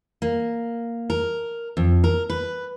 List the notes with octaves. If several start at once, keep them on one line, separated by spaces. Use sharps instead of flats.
A#3
A#4
F2
A#4
B4